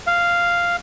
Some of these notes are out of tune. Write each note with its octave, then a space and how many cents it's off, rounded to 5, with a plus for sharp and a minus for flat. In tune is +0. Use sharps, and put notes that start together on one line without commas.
F5 -5